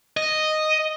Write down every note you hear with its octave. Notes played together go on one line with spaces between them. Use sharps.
D#5